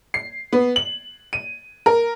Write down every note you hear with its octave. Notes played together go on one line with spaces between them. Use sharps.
C7
B3
F#7
D#7
A#4